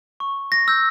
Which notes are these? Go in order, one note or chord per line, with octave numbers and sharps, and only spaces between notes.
C#6
A#6
E6 G6